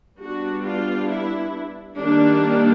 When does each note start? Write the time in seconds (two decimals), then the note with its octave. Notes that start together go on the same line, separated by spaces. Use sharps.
0.19 G3 B3 D4 F#4
0.63 F4
1.08 E4
1.96 D#3 G3 A#3 D4